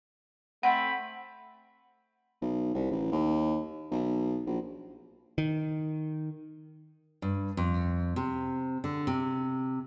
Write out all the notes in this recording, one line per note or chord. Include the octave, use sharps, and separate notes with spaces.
A3 C4 F#5 B5
B1
C2
A1
D#2
B1
A#1
D#3
G2
F2
C3
D3
C3